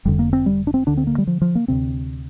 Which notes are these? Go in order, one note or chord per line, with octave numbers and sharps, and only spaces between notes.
F1 F2 D3 G3
A#3
C4
G3
D4
C4
D2 D3 D4
C4
A#3
G3
F3
F3
A#3
D2 C3 C4